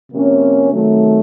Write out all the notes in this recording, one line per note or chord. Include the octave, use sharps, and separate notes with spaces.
C3 F3 A#3 C#4
C3 D#3 F#3 A3